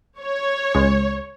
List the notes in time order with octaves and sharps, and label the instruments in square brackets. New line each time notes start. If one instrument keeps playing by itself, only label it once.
[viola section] C#5
[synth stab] C#2 G#3